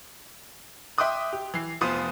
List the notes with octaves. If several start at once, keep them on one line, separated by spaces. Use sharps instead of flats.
E5 G5 C6 D6 D#6 F#6
G4
E3 C7
F1 B3 F4 C5 D#6 D#7